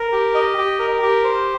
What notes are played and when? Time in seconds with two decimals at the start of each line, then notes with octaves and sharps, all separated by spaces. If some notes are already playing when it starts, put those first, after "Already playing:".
Already playing: A#4
0.12 G4
0.35 D#5
0.58 G4
0.79 A#4
1.02 G4
1.24 C5